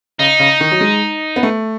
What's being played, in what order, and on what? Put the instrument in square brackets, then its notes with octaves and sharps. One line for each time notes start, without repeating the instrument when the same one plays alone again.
[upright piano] C#3 [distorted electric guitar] D#4
[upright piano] C#3
D#3
F#3
G#3
B3
A3